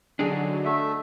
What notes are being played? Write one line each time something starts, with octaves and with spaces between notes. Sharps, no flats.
D3 F#3 D4 D#4 G#4
A3 E5